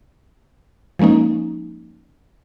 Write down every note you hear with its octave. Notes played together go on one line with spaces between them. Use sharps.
F3 G#3 A#3 C#4 D#4